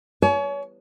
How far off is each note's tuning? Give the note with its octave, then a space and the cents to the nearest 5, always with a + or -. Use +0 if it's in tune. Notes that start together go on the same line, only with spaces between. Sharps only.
C#5 +30 G#5 +45